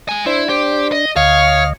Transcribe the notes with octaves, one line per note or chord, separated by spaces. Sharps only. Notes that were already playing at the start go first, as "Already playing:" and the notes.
G#3 G#5
D4 E4 C5
G4 C5
D#5
D2 C#5 D#5 F5